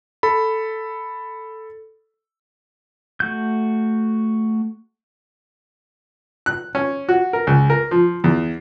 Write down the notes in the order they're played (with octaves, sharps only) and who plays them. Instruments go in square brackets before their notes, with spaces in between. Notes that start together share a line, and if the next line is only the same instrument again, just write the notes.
[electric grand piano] A4 B5
[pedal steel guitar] A3 F#4 G6
[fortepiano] F#6
C#4
F#4
A#4
C#2
A#4
F3
E2